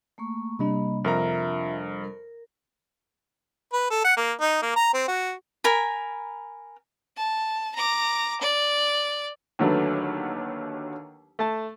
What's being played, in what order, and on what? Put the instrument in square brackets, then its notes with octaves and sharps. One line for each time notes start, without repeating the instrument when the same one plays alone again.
[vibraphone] A3 A#3 C#6
[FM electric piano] C3 G3 D4 [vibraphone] A#3 D#5 B5
[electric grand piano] F2 A#4 A#5 [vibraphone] F4 E5
[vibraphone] A#4
[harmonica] B4
A4
F#5
A#3
D#4
A#3
A#5
C4
F#4
[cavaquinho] A#4 G#5 B5
[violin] A5
A#5 D6
D5
[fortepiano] D#2 D3 F#3 A3 B4
A3 A5